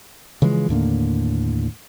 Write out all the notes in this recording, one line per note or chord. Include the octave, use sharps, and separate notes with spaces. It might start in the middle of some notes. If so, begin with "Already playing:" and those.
C#3 E3 F3 G#3
D#2 A2 D3 A#3